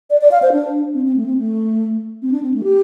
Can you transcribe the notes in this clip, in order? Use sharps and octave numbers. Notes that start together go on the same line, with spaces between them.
D5
D5
F5
C5
D4
C4
C4
A3
C4
A3
C4
D4
C4
A3
G4